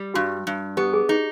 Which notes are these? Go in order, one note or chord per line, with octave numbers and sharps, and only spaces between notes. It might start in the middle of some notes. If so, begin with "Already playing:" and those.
Already playing: G3
G2 F#4
G2
B3 G4
G#4
D#4 G#4